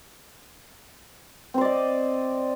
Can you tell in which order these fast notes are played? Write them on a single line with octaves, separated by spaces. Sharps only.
C4 C5 D5 D#5